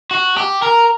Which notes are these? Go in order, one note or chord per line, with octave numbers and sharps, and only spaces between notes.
F#4
G4
A#4